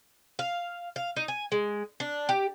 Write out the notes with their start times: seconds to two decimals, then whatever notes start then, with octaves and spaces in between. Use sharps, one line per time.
0.39 F5
0.96 F5
1.16 D#4
1.28 G#5
1.52 G#3
2.00 D4
2.29 G4